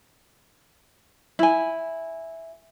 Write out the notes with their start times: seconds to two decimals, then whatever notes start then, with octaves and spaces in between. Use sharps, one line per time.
1.39 E4 G#5